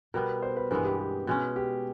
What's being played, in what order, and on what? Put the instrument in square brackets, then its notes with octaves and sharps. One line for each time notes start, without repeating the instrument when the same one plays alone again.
[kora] B2 G3 B3 [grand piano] A#4
[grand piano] C5
B4
[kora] G2 E3 G#3 B3 [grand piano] A#4
[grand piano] G4
G4
[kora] B2 G#3 C#4
[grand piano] G4